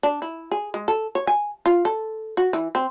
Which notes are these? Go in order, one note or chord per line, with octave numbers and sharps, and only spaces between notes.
D4
E4
G#4
G#3
A4
C#5
G#5
F4
A4
F#4
E3
C4